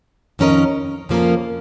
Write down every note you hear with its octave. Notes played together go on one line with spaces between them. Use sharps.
F2 D#3 C#4 A#4 D#5
F2 F3 A#3 C#4 A#4